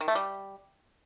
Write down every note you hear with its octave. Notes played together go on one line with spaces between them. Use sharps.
D#3
A3
G3